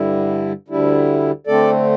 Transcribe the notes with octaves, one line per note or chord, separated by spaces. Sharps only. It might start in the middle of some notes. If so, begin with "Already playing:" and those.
Already playing: G2 D3 G3 E4
D2 D3 G3 E4
D3 A3 C4 A4 D5